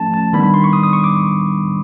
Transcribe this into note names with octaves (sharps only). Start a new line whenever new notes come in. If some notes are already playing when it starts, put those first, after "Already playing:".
Already playing: F3 A3 C#4 A5
A5
D#3 G3 B3 D4 B5
B5
C6
C#6
D#6
D#6
C#6
D6